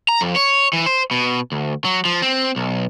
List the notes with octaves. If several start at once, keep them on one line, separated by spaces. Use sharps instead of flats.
A#5
F2
C#5
E3
C5
B2
D2
F#3
F3
C4
B1